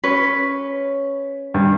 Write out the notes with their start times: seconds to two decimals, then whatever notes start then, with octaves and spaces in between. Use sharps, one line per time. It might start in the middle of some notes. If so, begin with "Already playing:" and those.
0.04 C#4 B4
1.54 G2